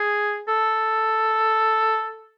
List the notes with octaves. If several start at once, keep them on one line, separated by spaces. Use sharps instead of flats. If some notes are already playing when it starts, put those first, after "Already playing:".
Already playing: G#4
A4